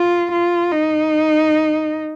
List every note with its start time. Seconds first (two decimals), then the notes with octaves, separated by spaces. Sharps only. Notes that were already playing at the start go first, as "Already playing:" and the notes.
Already playing: F4
0.31 F4
0.72 D#4